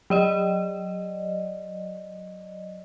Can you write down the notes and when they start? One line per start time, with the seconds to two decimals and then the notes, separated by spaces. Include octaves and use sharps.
0.10 F#3 D5 D#5